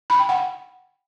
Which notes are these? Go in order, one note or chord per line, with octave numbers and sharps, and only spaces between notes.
B5
G5
F#5